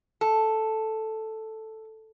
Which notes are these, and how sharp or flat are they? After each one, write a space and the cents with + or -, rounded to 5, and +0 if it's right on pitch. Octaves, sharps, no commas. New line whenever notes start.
A4 +0